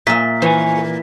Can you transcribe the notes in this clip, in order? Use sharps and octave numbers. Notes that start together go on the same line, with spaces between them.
A#2 E5 G#5 B6
E3 C5 C#5 G#5